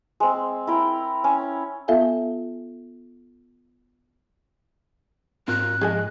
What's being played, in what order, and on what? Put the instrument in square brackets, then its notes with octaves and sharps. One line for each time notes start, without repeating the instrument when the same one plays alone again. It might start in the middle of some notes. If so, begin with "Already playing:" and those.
[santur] G#3 C4
E4 A#4 G5
C#4
[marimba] B3 F4 A4 E5 F5 G#5
[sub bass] G#2 [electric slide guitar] C4 F4 A#4 [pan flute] F#6
[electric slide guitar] F3 G#3 D#5 [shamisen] G#4 A4 G#5